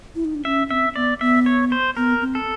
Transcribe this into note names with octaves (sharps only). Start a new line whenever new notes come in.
E4
D#4
D4
C#4 E5
C4 E5
B3 D5
B3 E5
C#5
C5
B3 A#4
C4
A4